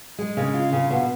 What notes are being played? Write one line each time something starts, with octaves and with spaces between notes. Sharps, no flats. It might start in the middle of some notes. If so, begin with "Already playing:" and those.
G#3
C#3
F4
C#3
B2